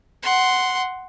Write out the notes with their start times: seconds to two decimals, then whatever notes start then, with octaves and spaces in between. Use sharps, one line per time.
0.23 F#5 C6